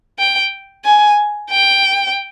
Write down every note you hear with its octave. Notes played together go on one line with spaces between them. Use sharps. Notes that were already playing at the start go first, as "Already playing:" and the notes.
G5
G#5
G5